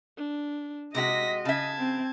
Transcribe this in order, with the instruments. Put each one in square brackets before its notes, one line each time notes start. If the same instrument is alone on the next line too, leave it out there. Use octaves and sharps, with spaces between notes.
[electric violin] D4
[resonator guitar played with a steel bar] C3 G#3 F#4 [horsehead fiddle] D#5 [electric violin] A#6 B6
[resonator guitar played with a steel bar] C#3 E5 [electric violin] A5 G#6
[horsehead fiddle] C4